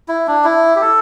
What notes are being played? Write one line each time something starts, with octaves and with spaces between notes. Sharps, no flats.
E4
D4
E4
G4
A4